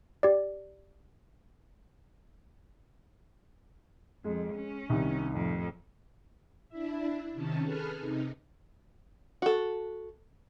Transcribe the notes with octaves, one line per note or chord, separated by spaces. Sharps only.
G4 D5
F2 G#3
C#4
C2 D#3
F2 A2
D4 E4 E5
C3 D#3 C#4 A5
G#4 A4 B4 F6
C3 D#4
F#4 A4